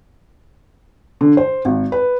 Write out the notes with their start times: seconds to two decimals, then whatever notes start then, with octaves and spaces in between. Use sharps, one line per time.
1.21 D3
1.37 C5
1.65 G#1
1.92 B4